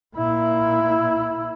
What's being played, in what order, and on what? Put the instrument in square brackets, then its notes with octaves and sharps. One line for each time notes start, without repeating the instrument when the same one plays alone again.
[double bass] A#2 E4